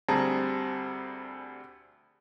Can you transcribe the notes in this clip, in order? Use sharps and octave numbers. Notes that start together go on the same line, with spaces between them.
D2 G3 C4 G#4 A5 A#5